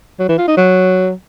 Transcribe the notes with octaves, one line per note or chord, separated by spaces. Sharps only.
F#3
E3
F4
D#4
F#3